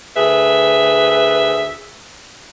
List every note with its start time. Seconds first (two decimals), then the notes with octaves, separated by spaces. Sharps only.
0.16 D2 G#4 B4 E5